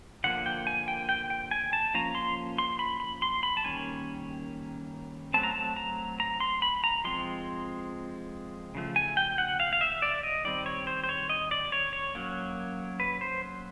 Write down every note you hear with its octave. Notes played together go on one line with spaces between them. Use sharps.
D3 F3 A#3 F#5
G5
G#5
G5
G5
G5
G#5
A5
F3 A#3 C#4 A#5
C6
C6
B5
B5
C6
B5
A5
D#3 G3 A#3 C#4 G#5
F#3 A3 C4 A5
A#5
A5
A#5
A#5
C6
B5
A#5
F3 G#3 C4 C6
C#3 F3 A3
G#5
G5
F#5
F5
F5
E5
D5
D#5
D#3 G3 C4 D5
C#5
C5
C5
C#5
D#5
D5
C#5
C#5
F#3 A#3 C#4
B4
C5